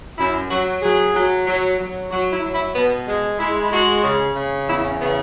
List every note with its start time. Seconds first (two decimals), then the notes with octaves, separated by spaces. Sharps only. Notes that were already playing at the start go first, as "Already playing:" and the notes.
0.18 F#2 E4
0.50 F#3 F#4
0.82 F#3 G#4
1.14 F#3
1.47 F#3
1.79 F#3
2.11 F#3 F#4
2.32 E4
2.43 F#3
2.54 E4
2.75 B2 B3
3.07 G#3
3.39 G#3 E4
3.60 E4
3.71 G#3 F#4
4.04 C#3
4.36 C#3
4.67 E2 E4
4.84 C#4
5.00 C#3 B3